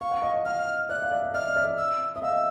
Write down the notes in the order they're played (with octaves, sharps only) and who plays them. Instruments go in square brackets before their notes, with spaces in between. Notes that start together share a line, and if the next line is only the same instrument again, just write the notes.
[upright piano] F5 [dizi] C#6
[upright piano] F#5
D#5 F5
[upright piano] D#5 F5 [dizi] F6
[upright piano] D5 E5 [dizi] F#6
[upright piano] F5
D5 E5
D#5
[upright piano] D5 E5 [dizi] F6
[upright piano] D5 E5
[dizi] E6
[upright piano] E5 [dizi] D#6
[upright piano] D#5 F5 [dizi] E6